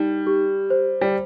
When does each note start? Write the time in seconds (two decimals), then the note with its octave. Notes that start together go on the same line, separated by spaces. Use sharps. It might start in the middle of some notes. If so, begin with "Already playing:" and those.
Already playing: G3 D#4
0.27 G4
0.70 C5
1.02 G3